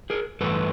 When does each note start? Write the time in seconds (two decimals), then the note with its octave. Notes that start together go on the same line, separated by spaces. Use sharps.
0.10 G#4 A#4
0.41 G2 E3 A3 A4 B4